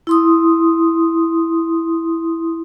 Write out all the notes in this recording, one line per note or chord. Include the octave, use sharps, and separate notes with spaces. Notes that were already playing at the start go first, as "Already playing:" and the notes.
E4 C6 D#6